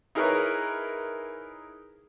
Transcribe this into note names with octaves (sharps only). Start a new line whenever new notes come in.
D#4 E4 G#4 A#4 B4 C#5